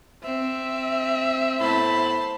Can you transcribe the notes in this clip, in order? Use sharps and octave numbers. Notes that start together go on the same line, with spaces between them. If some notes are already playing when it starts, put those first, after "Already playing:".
C4 E5
A2 B3 C5 A5 B5